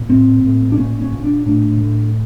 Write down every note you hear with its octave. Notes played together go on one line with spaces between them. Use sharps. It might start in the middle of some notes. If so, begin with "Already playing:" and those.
Already playing: A#2
A2 C4
A2
D4
A#2 C#4
C#4
A#2
D4
A2 D4
A2